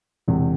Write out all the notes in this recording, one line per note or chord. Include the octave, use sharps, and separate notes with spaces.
E1 E2 C3